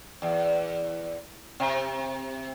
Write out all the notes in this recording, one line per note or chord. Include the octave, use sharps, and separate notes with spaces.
E2
C3